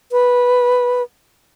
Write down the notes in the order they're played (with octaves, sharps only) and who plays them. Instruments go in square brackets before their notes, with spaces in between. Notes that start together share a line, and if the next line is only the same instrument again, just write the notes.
[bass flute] B4